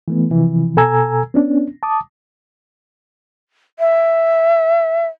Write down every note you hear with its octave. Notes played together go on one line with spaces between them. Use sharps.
E3 A3 B3
C3 E3 F3
B2 A4 G#5 A#5 E6 G#6
B3 C#4 D4
A5 D6 D#6
E5